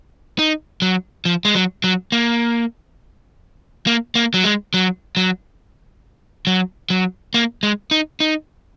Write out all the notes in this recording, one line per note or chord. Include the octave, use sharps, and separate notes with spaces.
D#4
F#3
F3
G#3
F#3
F#3
A#3
A#3
A#3
F#3
G#3
F#3
F#3
F#3
F#3
A#3
G#3
D#4
D#4